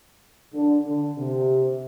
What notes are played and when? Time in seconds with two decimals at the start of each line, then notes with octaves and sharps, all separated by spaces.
0.54 D3
0.86 D3
1.18 C3